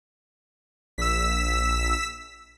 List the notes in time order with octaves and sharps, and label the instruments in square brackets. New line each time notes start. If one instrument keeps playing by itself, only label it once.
[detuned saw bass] A#1 [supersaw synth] E6 B6